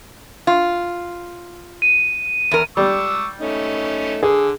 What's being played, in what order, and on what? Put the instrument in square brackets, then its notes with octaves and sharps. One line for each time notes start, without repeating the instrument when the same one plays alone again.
[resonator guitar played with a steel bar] F4
[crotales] D#7
[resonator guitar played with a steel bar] E2 A#4
[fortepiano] G3 [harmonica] C#6 D6 E6
[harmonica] A3 C#4 D#4
[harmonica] D3 [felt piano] G#4